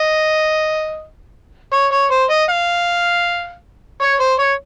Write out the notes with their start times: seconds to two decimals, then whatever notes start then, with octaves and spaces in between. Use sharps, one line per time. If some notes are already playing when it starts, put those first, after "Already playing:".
Already playing: D#5
1.73 C#5
1.92 C#5
2.11 C5
2.30 D#5
2.49 F5
4.01 C#5
4.20 C5
4.39 C#5